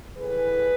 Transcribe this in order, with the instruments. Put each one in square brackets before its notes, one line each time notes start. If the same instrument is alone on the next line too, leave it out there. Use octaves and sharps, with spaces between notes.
[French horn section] A2 E3 G#4 B4